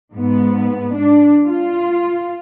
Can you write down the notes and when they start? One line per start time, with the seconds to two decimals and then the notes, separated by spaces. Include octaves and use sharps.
0.13 G#2 B3
0.97 D4
1.46 F4